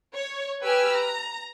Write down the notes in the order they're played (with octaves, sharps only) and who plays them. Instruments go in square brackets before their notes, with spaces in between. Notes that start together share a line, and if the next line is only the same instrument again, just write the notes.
[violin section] C#5
G4 B4 G#5 E6 F6
A#5